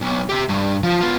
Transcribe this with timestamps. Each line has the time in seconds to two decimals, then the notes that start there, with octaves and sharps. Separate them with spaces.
0.01 B1
0.29 G4 E5
0.49 G2
0.83 F3
1.01 B3 F4